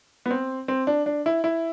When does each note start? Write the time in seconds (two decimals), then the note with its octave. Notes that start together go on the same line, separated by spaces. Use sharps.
0.26 B3
0.30 C4
0.68 C4
0.87 D4
1.06 D4
1.26 E4
1.44 E4